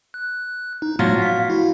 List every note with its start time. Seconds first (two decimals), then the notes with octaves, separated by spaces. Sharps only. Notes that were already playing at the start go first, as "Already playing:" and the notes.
0.14 F#6
0.82 D#4
0.99 A2 F3 F#3 A3 B3 F4
1.18 F5 B6
1.50 E4 F#4